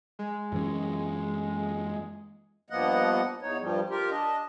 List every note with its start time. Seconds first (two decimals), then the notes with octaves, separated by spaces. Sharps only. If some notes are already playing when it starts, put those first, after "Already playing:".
0.19 G#3
0.52 F#2 E3 C#4
2.70 G2 F3 A#3 B3 D#5 F#5
3.42 E2 D#4 C#5
3.60 G2 F3 G3
3.90 F4 G4 A#4
4.10 D4 D#5